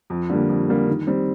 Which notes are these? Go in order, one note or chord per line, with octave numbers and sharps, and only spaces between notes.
F2
D3 G3 A#3
F2
D3 G3 A#3
D#3
G3 C4